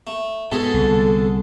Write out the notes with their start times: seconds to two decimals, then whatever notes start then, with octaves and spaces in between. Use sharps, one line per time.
0.07 A3
0.52 G#2 B2 G#3 G#4 A4
0.74 C2 D3